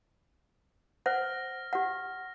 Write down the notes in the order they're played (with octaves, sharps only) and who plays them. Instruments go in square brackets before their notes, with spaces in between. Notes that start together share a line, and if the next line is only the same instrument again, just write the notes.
[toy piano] C5 F#5 [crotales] F6 A#6
[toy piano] G4 F#5